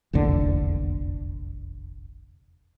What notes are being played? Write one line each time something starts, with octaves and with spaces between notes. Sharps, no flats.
F1 A#1 E2 D3